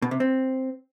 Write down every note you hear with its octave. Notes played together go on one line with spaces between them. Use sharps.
B2
C3
C4